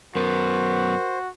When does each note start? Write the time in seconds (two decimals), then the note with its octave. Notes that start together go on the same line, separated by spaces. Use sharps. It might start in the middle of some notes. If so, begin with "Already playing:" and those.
0.15 F#2 B3 F#4 A#4 C5